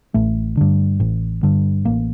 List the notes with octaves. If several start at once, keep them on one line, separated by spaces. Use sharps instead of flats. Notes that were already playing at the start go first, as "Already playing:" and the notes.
A1 A3
G2 D3
A1
G2 D3
A1 A#3